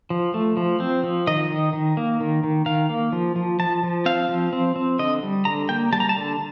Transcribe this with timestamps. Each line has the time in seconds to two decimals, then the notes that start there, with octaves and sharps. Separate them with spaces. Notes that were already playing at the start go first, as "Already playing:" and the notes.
0.10 F3
0.34 A3
0.57 F3
0.80 C4
1.03 F3
1.27 D#3 D#5
1.50 D#3
1.73 D#3
1.97 A#3
2.20 D#3
2.44 D#3
2.66 D#3 F5
2.90 A#3
3.12 F3
3.36 F3
3.60 F3 A5
3.83 F3
4.06 C4 F5
4.29 F3
4.53 C4
4.76 C4
4.99 D3 D#5
5.23 G3
5.45 D3 A#5
5.69 A#3 G5
5.93 G3 A5
6.00 A#5
6.09 A5
6.16 D3